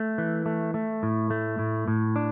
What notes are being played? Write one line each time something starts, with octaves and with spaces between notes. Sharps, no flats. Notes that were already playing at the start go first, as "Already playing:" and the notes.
Already playing: A3
E3
A3
A3
A2
A3
A2
A2
D4